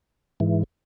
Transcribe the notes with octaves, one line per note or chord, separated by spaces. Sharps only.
G#2 E3